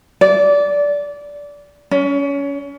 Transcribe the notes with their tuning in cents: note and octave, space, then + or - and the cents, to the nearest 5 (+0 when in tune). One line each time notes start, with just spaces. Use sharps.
D5 -20
C#4 +25